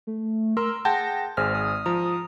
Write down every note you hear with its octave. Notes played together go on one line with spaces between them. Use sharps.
A3
A#4 C6 E6
G#4 F#5 G5 A5 G6 A#6
G#1 G#4 C5 F6
D#6
F3 A#5